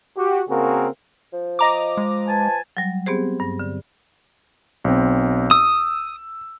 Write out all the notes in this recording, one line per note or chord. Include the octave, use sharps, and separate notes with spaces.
F#4 G4
C#3 A#3 C4 F#4 G#4 A#4
F3
D#5 A#5 D6
G#3
B4 G#5 A5
F#3 G3
B3 C4 G4 G#4 C5
G2
D3
B1 C4
D#6 E6